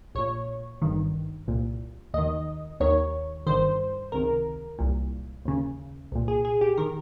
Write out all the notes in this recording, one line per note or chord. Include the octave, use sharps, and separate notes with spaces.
A#1 A#2 C#5
G#1 G2 D#3
C2 A#2
D#2 D#3 D#5
D#2 D#3 C#5
G1 G2 D#3 C5
C#2 C3 D#3 A#4
C2 A#2
D#2 C#3
C2 A#2
G#4
G#4
G4
D#3 A#4